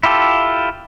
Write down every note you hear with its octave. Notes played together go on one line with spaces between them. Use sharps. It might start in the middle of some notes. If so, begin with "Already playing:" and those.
E4 F4 G4 A4